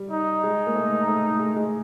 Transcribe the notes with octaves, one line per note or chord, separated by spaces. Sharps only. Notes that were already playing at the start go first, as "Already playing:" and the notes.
Already playing: G3
D#4
G#3
A#3
A3
A3
G#3
G#3